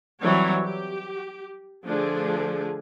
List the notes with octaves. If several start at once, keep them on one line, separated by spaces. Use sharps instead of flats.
E3 F#3 G3 C4 C#5
G4
D3 F3 A3 D4 G#4